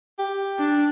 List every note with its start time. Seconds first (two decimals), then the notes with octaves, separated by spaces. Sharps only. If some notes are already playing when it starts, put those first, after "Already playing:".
0.19 G4
0.59 D4